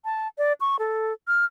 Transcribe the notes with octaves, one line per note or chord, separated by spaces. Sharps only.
A5
D5
C#6
A4
F6